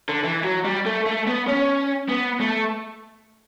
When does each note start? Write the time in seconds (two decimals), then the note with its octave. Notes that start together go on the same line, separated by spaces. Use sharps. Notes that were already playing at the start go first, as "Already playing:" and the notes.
0.09 D3
0.24 E3
0.44 F#3
0.65 G3
0.86 A3
1.07 A3
1.27 B3
1.48 C#4
2.08 B3
2.40 A3